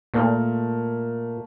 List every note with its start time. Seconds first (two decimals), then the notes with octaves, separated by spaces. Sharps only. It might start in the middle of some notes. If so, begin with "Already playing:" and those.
0.14 A#2 A3 A#3